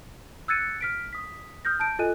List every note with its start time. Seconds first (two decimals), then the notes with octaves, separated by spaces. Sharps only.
0.48 E6 F#6 G#6 A6 C#7 D#7
0.81 F6 B6 D7
1.13 D#6 B6
1.65 D#6 F6 G6 A#6
1.80 A5 G6 D7
1.99 F4 A4 D#5 G#5 F#6 D#7